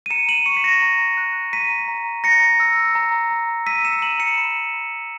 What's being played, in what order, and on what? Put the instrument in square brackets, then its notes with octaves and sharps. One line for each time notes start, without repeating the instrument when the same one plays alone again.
[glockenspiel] D#7
A#5 C#7 E7
D#7 F#7
C#6 C#7 E7
B6
A#6 C#7
A#5
F#6
A#5 B6 D#7
A#5
A#5 A#6 C#7
E6
A#5
A#5
E6 B6 D#7
C#7 E7
A#5 D#7 F#7
C#7 E7
B5
B5